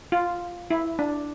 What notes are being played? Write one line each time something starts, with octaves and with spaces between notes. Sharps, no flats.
F4
E4
D4